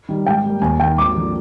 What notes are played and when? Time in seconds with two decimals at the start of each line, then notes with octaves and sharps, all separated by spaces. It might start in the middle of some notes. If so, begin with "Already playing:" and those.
0.09 D#3 G3
0.26 G#2 G5
0.44 G3 A#3
0.61 D#2 G#5
0.79 D#3 A#3 G5
0.98 G#1 D6
1.15 D3 F3 A#3